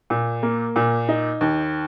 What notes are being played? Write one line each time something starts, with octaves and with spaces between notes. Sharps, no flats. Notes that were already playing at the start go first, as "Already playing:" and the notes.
A#2
A#3
A#2
D#4
D#2